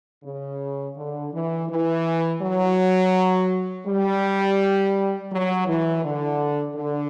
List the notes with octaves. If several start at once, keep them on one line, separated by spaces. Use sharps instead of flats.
C#3
D3
E3
E3
F#3
G3
F#3
E3
D3
D3